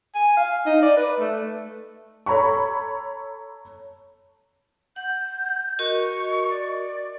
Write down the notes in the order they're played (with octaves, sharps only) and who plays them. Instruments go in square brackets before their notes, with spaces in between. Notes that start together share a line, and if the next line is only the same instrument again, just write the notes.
[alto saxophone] G#5
F5
D#4
D5
B4
A3
[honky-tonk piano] A4 C#5 A#5 B5 C#6
[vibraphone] F#5 [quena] G6
[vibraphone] F#4 A#4 D#5 [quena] C#6
[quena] D5